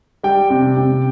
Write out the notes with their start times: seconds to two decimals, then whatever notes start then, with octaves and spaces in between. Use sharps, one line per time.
0.23 G3 G5
0.50 C3
0.77 C3